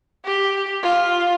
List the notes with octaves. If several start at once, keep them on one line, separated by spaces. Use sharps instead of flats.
G4
F4